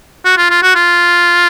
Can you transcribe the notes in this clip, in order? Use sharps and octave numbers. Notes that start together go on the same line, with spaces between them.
F#4
F4
F4
F#4
F4